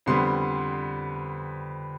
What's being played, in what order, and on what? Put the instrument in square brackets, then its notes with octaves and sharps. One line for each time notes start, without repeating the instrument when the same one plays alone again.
[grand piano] F2 D3 G3 B3 C6